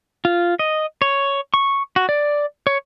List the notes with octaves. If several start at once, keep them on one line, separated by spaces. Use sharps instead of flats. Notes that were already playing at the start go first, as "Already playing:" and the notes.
F4
D#5
C#5
C#6
F#4
D5
C#5